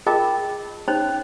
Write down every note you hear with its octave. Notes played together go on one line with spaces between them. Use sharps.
F4 G#4 A#4 D#5 G5 A5
C#4 D#4 C5 C#5 G5